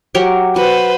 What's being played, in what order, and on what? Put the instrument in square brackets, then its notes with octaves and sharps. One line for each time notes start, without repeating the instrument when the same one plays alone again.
[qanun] F#3 G4 A#4
[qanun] F#4 [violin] B4 C5